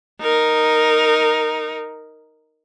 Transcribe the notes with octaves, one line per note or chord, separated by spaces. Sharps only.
D#4 A#4